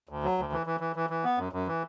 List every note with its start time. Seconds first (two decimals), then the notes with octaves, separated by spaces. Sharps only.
0.09 D2
0.23 F#3
0.38 D2
0.52 E3
0.66 E3
0.80 E3
0.96 E3
1.10 E3
1.24 B3
1.38 F#2
1.52 F#2
1.67 E3